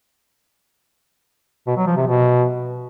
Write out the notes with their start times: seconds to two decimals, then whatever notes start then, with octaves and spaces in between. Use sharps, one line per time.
1.67 B2
1.77 F#3
1.87 F3
1.97 C3
2.07 B2